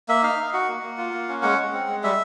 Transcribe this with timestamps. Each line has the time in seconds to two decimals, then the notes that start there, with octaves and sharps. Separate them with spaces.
0.08 A#3 E5
0.23 D#4 F5
0.39 D#4
0.53 F#4 F#5
0.68 A#3
0.83 A#3
0.98 F4
1.13 A#3
1.29 C#4
1.42 G#3 F#5
1.58 G#3
1.73 C4
1.88 G#3
2.03 G3 E5